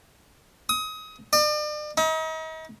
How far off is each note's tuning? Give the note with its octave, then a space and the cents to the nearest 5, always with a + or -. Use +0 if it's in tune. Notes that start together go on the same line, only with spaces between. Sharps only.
D#6 +30
D5 +40
D#4 +40